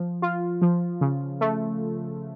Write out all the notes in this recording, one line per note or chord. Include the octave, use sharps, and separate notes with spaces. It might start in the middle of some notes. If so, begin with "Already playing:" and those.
Already playing: F3
F4
F3
C#3
A3